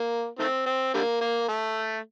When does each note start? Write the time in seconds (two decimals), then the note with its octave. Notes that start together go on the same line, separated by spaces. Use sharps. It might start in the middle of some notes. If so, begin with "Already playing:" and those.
Already playing: A#3
0.39 D#3 A3 C4
0.66 C4
0.94 D3 G3 A#3
1.21 A#3
1.49 A3